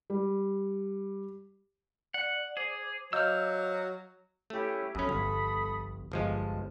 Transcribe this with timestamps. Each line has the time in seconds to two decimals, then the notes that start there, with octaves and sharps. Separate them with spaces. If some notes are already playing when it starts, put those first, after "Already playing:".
0.10 G3
2.14 D5 F#5
2.57 G#4 C5 D6
3.13 F#3 D#5 F5 E6 F6 G6
4.50 A3 C#4 E4 G4
4.95 A#1 F#2 C#4 A4 B5 D#6
5.09 G1
6.12 G1 F3 G#3 A5